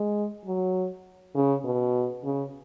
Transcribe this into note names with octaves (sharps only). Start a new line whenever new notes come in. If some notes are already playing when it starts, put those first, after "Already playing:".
Already playing: G#3
F#3
C#3
B2
C#3